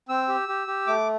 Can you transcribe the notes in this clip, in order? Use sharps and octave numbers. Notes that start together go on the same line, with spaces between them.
C4 E6
G4
G4
G4
A3 D6